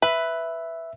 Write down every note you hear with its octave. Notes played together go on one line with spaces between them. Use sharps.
B4 E5